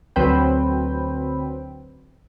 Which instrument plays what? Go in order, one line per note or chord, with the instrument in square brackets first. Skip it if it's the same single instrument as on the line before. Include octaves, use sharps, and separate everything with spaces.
[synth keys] D2 F#3 C4 B4 G5